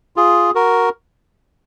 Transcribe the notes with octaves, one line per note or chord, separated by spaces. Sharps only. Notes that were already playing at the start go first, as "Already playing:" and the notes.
F4 G#4
F#4 A#4